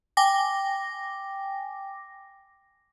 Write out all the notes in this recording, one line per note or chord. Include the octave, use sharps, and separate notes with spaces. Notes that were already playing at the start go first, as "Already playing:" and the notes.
G5 G#5 D6 A#6